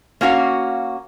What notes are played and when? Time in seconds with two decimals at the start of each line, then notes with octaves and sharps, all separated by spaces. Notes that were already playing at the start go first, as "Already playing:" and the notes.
0.21 A#3 C#4 F#4 F5